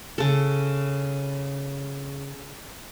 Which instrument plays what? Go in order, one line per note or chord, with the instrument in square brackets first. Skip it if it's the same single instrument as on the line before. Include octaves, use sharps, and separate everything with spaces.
[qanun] C#3 A4